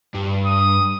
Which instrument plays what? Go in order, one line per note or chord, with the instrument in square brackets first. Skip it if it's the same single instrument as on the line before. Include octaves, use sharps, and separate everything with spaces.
[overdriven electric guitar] G2
[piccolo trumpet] D#6